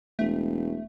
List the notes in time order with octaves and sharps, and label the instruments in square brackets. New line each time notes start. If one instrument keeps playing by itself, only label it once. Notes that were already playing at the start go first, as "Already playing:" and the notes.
[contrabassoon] E1 [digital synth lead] A3